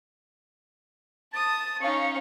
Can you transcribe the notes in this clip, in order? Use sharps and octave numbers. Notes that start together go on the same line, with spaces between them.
A5 D#6 A6
C#4 D#4 C#5 F5 C#7